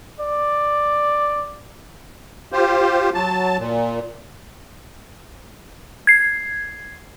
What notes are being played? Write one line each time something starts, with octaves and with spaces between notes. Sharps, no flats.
D5
F4 G4 C5
F#3 A5
A#2
G#6 C7